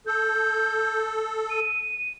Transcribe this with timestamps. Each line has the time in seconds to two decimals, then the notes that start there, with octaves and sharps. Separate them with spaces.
0.07 A4 G6
1.50 D#7